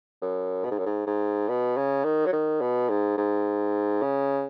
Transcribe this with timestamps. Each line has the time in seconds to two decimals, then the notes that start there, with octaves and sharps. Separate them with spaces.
0.22 F#2
0.65 B2
0.71 G#2
0.79 F#2
0.86 G#2
1.07 G#2
1.49 B2
1.77 C#3
2.04 D#3
2.26 F#3
2.32 D#3
2.61 B2
2.89 G#2
3.18 G#2
4.02 C#3